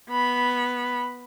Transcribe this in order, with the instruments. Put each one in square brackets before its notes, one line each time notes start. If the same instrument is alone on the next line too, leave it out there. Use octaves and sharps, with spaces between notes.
[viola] B3 B5